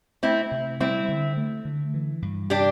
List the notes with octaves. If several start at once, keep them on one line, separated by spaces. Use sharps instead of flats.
A3 C4 E4
C3
G3 C4 E4
D3
A3
D3
E3
G2
C3 D4 G4